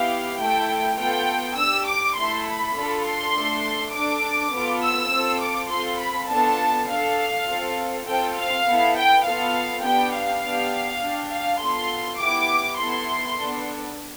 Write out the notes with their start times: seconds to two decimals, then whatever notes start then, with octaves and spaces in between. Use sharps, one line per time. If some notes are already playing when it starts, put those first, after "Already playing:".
Already playing: B3 E4 G4 F5
0.40 A3 E4 A4 G5
0.99 B3 F4 A4 G5
1.57 D4 G4 E6
1.87 D6
2.17 A3 E4 A4 C6
2.46 B5
2.75 D4 F4 A4
3.05 C6
3.35 A3 D4 A4
3.93 D4 A4 D6
4.52 B3 F4 A4
4.83 E6
5.11 C4 F4 A4
5.42 D6
5.71 C4 F4 A4 C6
6.00 B5
6.30 B3 D4 F4 A4 A5
6.89 D4 A4 F5
7.48 C4 F4 A4
8.07 C4 F4 A4 G5
8.36 F5
8.65 B3 E4 A4
8.95 G5
9.24 B3 F4 A4 F5
9.83 B3 D4 G4 G5
10.14 F5
10.43 B3 D4 G4
11.02 D4 G4
11.31 F5
11.60 B3 F4 A4 C6
12.19 B3 E4 G4 D6
12.78 B3 E4 A4 C6
13.38 B3 D4 A4